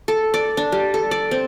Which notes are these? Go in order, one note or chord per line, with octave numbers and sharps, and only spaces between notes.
A4
D5
D4
G3
A4
D5
C4